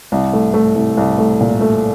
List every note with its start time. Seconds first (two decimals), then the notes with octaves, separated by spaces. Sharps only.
0.12 C2
0.33 A3
0.54 A3
0.76 C2
0.97 C2
1.18 A3
1.41 A#2
1.61 A3